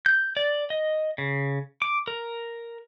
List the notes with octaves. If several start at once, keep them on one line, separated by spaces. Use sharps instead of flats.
G6
D5
D#5
C#3
D6
A#4